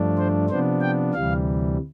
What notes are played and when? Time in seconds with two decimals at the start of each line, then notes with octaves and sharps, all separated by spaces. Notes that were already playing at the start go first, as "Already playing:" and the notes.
Already playing: G2 F3 A3 D4
0.17 C5
0.49 C3 F3 B3 D4 C5
0.81 G5
1.14 D2 C3 E3 G3 F5